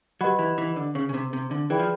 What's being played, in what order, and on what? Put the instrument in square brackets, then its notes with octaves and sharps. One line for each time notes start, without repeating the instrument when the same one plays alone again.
[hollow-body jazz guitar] F#3 [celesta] G4 B4 D#5 F#5 B5
[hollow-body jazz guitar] E3
E3
D3
C#3
C#3
C3
C3
D3
[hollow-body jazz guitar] E3 [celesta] G#4 B4 D5 G5 B5
[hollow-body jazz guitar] F3